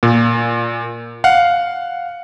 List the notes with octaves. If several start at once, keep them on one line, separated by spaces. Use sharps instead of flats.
A#2
F5 F#5